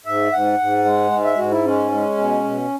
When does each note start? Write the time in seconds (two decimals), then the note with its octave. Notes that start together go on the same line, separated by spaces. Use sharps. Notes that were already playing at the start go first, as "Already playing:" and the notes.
0.06 G#2 E5
0.33 G#2 F#5
0.59 G#2
0.85 G#3
1.11 G#2
1.25 E5
1.38 G#2 F#4
1.51 E4
1.65 G#3 C#4
1.91 G#3
2.18 B2
2.44 B2